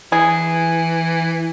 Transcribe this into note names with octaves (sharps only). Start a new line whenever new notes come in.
E3 G#4